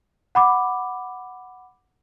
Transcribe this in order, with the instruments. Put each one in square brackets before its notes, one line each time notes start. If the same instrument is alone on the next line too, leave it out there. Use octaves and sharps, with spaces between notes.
[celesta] F#5 B5 D6